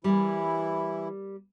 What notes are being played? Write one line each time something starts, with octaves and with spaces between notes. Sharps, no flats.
E3 G3 A#3 E4